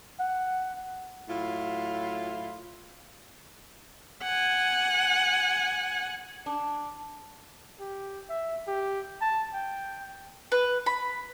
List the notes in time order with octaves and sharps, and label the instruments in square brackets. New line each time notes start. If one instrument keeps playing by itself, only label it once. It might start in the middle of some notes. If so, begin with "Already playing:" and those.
[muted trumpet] F#5
[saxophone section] A2 F#3 E4 F4
[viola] F#5 G#5
[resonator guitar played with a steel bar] D4
[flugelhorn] G4
E5
G4
A5
G5
[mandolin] B4
B5